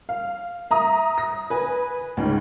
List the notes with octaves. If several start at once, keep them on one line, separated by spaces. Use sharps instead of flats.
F5
E5 A#5 D#6
A#6
B4 G#5
C#2 G#2 C#3